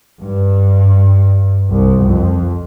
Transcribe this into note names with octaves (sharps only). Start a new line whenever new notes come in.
G2
C2
F2